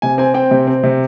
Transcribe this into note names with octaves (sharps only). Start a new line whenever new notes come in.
C3 G#5
C4 G#5
C4 G5
C3
C4
C3